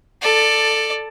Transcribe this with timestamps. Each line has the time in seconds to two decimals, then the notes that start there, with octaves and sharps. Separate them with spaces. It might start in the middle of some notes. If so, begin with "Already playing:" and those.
0.22 A4 D5